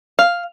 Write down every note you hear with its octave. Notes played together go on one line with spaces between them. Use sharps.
F5